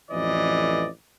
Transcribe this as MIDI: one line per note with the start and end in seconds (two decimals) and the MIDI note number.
0.11 0.87 33
0.11 0.87 41
0.11 0.87 52
0.11 0.87 74
0.11 0.87 75